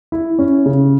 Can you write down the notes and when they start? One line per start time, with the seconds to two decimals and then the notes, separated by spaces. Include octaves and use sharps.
0.12 E4
0.39 C#4
0.66 C#3